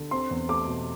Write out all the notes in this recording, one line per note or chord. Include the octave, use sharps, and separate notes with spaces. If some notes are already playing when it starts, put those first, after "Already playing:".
Already playing: D3
C4 C6
E2
A3 D6
B2